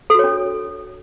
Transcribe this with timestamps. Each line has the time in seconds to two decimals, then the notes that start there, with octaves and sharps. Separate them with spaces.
0.10 A4
0.14 F#4
0.19 C#5
0.24 D4